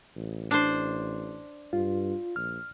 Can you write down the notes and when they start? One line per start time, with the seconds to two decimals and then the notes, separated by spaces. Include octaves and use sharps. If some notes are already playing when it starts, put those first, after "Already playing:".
0.16 A1
0.51 D4 C5
1.73 G2 F4
2.36 A#1 F6